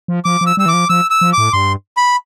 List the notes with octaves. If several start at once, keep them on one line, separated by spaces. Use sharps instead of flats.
F3
F3 D6
F3
E6
G3 E6
E3 D6
F3
F3 E6
E6
F3
A2 D6
G2 C6
B5